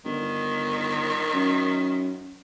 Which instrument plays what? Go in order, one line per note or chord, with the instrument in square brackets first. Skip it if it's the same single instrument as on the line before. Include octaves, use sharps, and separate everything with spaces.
[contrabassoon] G1 [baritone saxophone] D#3
[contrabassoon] F#2